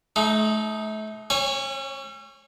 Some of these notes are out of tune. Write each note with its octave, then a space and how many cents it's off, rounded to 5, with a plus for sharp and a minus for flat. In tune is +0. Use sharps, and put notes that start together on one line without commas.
A3 -35 D#4 +0
C#4 -35 C#5 +10 G#5 +0